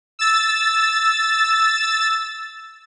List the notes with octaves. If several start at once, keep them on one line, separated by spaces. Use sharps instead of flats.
E6 A6